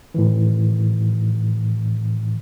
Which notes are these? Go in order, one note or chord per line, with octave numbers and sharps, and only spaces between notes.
A2 D#3 E3